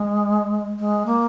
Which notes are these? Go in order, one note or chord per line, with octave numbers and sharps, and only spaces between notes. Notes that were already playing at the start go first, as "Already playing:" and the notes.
Already playing: G#3
G#3
A#3